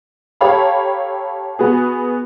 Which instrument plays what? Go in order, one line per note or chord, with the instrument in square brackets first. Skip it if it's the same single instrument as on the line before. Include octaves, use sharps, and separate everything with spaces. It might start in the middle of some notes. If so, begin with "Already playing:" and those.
[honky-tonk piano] G4 A4 C#5 F5 A#5 B5
B3 F#4 G#4